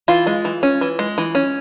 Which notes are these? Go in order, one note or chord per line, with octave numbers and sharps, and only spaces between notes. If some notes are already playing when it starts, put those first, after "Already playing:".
E3 F4
G#3
E3
C#4
E3
G#3
E3
C#4